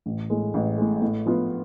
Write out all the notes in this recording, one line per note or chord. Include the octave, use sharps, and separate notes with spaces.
A1
A2 G#3
A1
A2 G#3
A2
F3 B3 F4